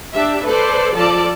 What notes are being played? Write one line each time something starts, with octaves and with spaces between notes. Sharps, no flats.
D4 G4 E5
A4 B4 C5 D5
F3 A4 D5 A5